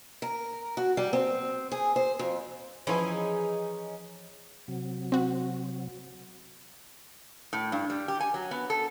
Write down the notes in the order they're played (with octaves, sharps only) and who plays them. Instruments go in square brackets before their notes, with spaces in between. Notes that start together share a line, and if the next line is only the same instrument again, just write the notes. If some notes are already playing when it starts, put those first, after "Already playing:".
[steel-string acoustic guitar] A#4
F#4
G3
C4
G#4
C5
F2
[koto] E3 F3 E4 [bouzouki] C#4 D#4 G#4
[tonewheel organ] C3 F#3
[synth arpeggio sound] C4 F#4
[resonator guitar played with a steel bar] A2
G2
G3
G4
G#5
F#3
B3
A4